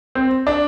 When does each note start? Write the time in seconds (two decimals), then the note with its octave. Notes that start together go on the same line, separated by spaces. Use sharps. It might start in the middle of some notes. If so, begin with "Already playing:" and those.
0.15 C4
0.47 D4